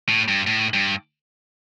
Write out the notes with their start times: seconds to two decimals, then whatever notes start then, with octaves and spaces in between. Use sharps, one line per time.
0.09 A2
0.28 G2
0.47 A2
0.74 G2